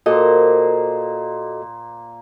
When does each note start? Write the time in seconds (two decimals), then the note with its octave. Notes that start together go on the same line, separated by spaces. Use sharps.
0.06 A#2 A#3 F#4 A4 C5 D#5